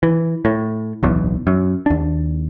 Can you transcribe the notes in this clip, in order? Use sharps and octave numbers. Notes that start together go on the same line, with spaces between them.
E3
A2
D1 B1 E2
F#2
D#2 D4